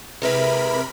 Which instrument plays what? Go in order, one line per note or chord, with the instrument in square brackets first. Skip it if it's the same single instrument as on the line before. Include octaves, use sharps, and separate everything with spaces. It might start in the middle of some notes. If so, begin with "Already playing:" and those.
[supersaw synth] C3 A#4 B5 [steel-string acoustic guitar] G#3 E4 B4